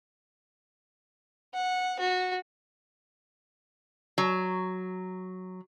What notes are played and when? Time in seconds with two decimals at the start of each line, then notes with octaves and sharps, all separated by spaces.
1.54 F#5
1.99 F#4
4.18 F#3